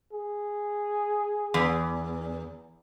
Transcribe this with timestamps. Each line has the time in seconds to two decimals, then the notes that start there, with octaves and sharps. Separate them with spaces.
0.12 G#4
1.54 E2